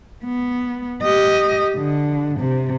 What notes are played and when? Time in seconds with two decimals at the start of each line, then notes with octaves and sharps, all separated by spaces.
0.25 B3
1.03 G4 D#5
1.77 D3
2.40 C3